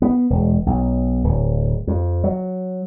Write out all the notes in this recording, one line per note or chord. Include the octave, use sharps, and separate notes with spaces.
B3
E1
B1
D1
F2
F#3